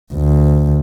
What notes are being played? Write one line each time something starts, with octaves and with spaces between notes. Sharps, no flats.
D2